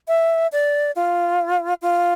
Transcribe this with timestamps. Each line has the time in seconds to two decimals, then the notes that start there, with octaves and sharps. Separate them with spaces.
0.08 E5
0.52 D5
0.96 F4
1.82 F4